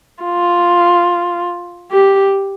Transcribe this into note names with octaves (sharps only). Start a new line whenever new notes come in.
F4
G4